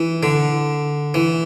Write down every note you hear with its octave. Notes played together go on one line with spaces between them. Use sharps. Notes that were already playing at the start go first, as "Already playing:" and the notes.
Already playing: E3
D3
E3